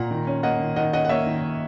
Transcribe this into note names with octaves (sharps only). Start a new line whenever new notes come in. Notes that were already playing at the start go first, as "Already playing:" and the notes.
Already playing: A#2 F#5 A#5
D#3
C#4
A#3 D#5 F#5
D#3
D#3 D#5 F#5
C#4 D#5 F#5
F#5
A#3 C#5 E5
D#3